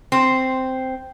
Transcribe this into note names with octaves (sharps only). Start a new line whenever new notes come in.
C4